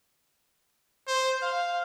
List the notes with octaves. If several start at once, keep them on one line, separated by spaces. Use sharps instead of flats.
C5
F5